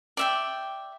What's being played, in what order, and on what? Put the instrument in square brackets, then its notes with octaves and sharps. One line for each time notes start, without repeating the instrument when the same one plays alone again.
[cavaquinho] D5 E5 G5